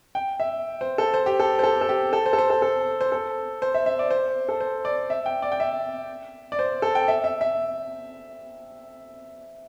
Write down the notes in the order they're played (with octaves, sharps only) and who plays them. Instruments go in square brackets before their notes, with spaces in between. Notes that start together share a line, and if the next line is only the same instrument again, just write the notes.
[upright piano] G5
E5
C5
A4
C5
G4
A4
C5
A4
A4
G4
A4
C5
A4
C5
A4
A4
C5
A4
C5
E5
E5
D5
C5
A4
C5
D5
E5
G5
D5
G5
E5
D5
C5
A4
G5
E5
E5
E5